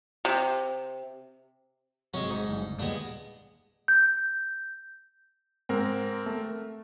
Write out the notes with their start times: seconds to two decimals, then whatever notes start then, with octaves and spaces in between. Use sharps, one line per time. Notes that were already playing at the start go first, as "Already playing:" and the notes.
0.25 C3
2.14 G#1 C3 F#3 G#3 C#4
2.30 G#2
2.49 F#1 D2 G2
2.79 D#2 A#2 G3 G#3 B3 D4
3.88 G6
5.69 G#2 C4 A#4
6.26 A3